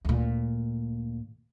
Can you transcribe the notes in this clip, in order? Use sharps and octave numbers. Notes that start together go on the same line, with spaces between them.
D2 A#2